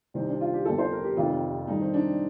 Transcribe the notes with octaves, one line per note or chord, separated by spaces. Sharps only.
C2 C3 D#3 C4
D4
F4
G4
G1 F2 D3 A4
C5
A#4
G4
F1 F2 C3 D#3 F4
G2 D#3 A3 D#4
C4
D4